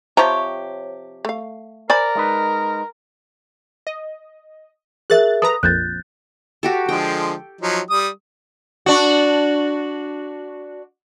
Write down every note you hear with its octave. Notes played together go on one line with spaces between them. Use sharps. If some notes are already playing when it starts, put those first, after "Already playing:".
C3 F3 G4 C#5 A#5
A3 F5
A#4 C5 D5 G#5 B5
G#3 D#4 B4
D#5
G#4 A#4 E5 F#6 A6
A4 B4 A#5 D#6
A#1 F2 A#2 F#6 G6 A6
F#4 G4 A4
D3 F3 G#3 G5
F3 F#3 D#4
G3 D#6
D4 F#4